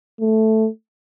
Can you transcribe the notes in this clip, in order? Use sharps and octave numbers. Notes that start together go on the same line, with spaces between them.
A3